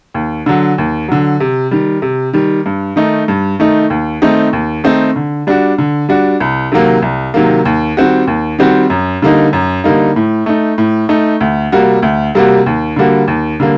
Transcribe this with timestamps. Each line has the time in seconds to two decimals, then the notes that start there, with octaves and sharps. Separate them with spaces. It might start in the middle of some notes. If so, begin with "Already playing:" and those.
0.14 D#2
0.46 D3 F#3
0.78 D#2
1.08 D3 F#3
1.40 C3
1.71 D#3 G3
2.02 C3
2.33 D#3 G3
2.66 G2
2.96 D#3 A3 D#4
3.28 G2
3.59 D#3 A3 D#4
3.90 D#2
4.22 D#3 A3 C4 D#4
4.53 D#2
4.84 D#3 A3 C4 D#4
5.16 D3
5.47 G3 D4 F#4
5.78 D3
6.09 G3 D4 F#4
6.40 C2
6.72 C3 D#3 F#3 A#3
7.02 C2
7.34 C3 D#3 F#3 A#3
7.65 D#2
7.97 D#3 G3 C4 F#4
8.27 D#2
8.59 D#3 G3 C4 F#4
8.90 F#2
9.22 D3 G3 A#3 D#4
9.53 F#2
9.84 D3 G3 A#3 D#4
10.16 A2
10.46 A3 D#4
10.78 A2
11.09 A3 D#4
11.40 D2
11.72 C3 G3 A#3 F#4
12.02 D2
12.35 C3 G3 A#3 F#4
12.66 D#2
12.96 D3 G3 A#3 F#4
13.28 D#2
13.60 D3 G3 A#3